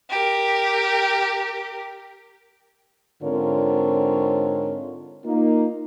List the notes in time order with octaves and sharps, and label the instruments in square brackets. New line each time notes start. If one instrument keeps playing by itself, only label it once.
[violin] G4 A#4
[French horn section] G#2 D3 C4 F4 A#4 C#5
A#3 D#4 F4